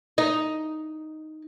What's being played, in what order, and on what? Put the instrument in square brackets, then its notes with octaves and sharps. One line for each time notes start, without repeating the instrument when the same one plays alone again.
[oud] D#4